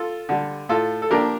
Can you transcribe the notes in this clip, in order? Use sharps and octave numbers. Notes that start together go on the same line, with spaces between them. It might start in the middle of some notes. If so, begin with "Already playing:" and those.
Already playing: F4 A4
D3 G3
A2 F4 A4
A4
F3 A#3 D4 G4 A#4